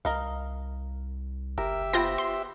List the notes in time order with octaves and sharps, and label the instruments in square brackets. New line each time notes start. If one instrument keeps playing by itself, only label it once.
[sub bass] C2 [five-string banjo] A#4 D#5 F5
[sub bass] F#1 [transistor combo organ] G4 E5 [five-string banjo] A#4
[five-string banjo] B3 C5 [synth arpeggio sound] F4 G5 A#6
[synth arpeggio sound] C6